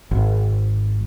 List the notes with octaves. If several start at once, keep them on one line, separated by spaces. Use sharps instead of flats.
G#1